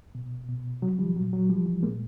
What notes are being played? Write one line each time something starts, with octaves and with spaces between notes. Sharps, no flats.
B2
B2
C3 F#3
D#3 F3 G3
A#2 F#3
F#3
C3 F3 G3
E3
A#2 G#3 A#3